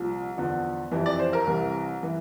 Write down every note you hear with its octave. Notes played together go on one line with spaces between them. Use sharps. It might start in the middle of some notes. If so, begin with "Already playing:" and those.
Already playing: C2 A#2 F3
E2 D3 F3
F2 C3 E3
D5
C5
A#4
C2 C3 E3
E3